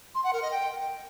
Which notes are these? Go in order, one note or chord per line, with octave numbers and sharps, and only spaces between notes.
C6
F#5
A#4
D#5
G5